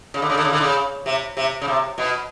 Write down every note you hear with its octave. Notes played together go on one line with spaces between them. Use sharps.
C#3
D3
C#3
D3
C#3
D3
C#3
C3
C3
C#3
C3
B2